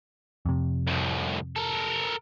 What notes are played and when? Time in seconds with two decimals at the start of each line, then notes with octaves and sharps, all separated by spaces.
0.46 F2 C3
0.87 C2 A2
1.56 A4 A#4